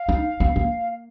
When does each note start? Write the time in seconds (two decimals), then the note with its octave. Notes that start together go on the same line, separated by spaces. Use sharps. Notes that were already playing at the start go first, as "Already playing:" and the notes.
Already playing: F5
0.09 D#4
0.40 B3
0.56 A#3